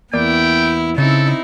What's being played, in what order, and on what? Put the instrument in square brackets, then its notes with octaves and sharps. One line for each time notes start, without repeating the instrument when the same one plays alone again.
[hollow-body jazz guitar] E2 A#3 D5 [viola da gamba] B3 E4 [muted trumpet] G5
[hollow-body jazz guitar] C#3 [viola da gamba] C4 D#4 E4 [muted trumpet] A4